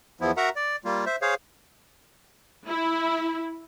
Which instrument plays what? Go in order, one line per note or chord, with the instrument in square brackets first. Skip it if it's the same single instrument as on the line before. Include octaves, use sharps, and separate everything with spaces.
[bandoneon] E2 F3 B3 E4
F#4 A#4 E5 F#5 A#5
D5
G3 A#3 F4
C5 E5
G#4 C5 C#5 F5
[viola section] E4